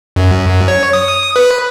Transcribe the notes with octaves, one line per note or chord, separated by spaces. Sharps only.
F#2
C#5
D#6
B4